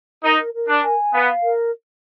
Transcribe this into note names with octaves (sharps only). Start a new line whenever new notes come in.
D#4 A#4
A#4
D4
G#5
B3 F5
A#4